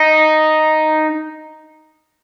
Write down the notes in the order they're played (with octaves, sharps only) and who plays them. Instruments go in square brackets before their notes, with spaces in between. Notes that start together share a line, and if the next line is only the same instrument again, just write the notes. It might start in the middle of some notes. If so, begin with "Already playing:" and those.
Already playing: [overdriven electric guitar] D#4